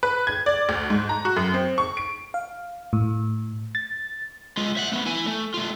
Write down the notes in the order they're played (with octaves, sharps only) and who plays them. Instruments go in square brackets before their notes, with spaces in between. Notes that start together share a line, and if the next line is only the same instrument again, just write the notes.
[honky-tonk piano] B4
G#6
D5
D2
G#2
A#5
F#4
F#2
C4
C#6
D7
[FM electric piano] F5
A2
A6
[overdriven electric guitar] G#3 F4
E5 F#5
A3 B3
E4 G#5
A3
A3 F4